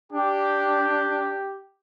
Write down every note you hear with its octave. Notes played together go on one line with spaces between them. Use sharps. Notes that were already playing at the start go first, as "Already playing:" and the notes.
D4 G4